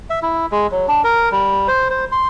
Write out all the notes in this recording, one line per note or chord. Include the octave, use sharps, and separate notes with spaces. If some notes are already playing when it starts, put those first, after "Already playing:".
E5
E4
G#3
F#3
D4
A#4
G3
C5
C5
C6